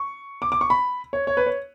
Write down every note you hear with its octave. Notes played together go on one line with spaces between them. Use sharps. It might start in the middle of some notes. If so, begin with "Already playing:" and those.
Already playing: C#6
D6
D6
C#6
B5
C#5
C#5
B4
C#5